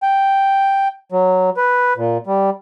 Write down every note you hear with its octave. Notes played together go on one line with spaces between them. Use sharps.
G5
F#3
B4
A#2
G3